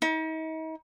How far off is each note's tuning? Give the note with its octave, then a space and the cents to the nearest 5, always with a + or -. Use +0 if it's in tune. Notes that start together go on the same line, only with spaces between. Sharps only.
D#4 +40